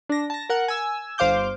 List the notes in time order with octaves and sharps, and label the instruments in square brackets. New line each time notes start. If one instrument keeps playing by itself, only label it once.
[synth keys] D4 A#6
A5 A#6
A#4 F#5
G#5 E6
G1 C5 F5 D6 G6